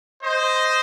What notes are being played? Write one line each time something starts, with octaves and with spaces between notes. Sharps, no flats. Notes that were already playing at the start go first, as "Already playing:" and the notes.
C5 D#5